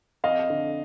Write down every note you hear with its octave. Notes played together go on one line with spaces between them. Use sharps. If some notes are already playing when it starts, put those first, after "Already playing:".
F2 D#5 F5
D3